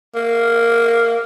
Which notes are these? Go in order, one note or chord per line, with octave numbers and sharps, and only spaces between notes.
A#3